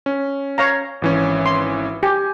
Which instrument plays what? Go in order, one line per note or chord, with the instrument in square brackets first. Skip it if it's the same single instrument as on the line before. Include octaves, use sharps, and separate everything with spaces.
[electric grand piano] C#4
[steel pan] C#5 F5 A#5
[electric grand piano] G#1 E3 C#4
[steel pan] C6
[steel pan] G4 [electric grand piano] G#5